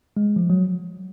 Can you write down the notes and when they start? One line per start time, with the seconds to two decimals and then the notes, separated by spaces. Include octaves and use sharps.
0.17 G#3
0.36 F3
0.50 F#3